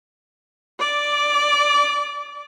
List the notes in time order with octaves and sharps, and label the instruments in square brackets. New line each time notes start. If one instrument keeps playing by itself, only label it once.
[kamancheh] D5 D6